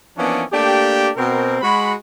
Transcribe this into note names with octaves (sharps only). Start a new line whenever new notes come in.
E3 F3 A#3 B3 C#4 D4
A3 A#3 D4 G4
B2 C4 A#4
G#3 F#4 B5